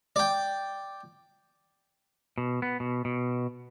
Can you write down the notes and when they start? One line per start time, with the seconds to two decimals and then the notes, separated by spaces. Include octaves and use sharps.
0.16 D5 G5
2.38 B2
2.62 B3
2.80 B2
3.05 B2